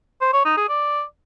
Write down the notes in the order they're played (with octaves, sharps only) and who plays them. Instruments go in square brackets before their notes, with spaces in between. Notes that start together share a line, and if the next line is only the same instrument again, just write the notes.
[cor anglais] C5
C#5
D#4
G#4
D5